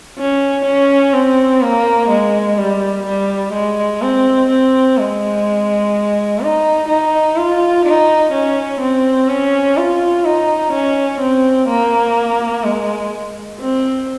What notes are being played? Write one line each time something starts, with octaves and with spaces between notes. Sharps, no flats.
C#4
C#4
C4
A#3
G#3
G3
G3
G#3
C4
C4
G#3
D#4
D#4
F4
D#4
C#4
C4
C#4
F4
D#4
C#4
C4
A#3
G#3
C4